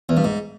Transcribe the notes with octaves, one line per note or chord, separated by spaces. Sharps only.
E2
G2
G#2